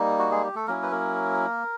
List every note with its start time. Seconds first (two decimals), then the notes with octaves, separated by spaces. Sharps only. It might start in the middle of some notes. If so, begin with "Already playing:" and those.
Already playing: G3 A#3 D#4
0.19 F#4
0.31 G#3 G#4
0.44 G4
0.55 A3 A4
0.67 F#3 A#3 C#4 E4 A#4
0.83 B4
0.92 A#3 A#4